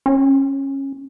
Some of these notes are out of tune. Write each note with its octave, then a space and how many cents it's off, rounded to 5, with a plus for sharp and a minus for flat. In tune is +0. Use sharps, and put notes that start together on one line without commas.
C#4 -20